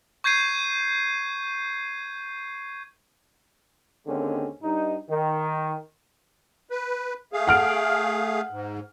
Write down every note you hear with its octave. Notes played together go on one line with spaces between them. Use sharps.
C#6 G6 G#6 C7 D#7
D#2 D3 G#3 C4 C#4
G2 D#4
D#3
B4
A3 G#4 F5
F#5 F6 D7
G#2